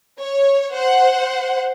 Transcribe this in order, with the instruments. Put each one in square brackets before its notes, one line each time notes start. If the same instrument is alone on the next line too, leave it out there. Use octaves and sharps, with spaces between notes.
[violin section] C#5
C5 F#5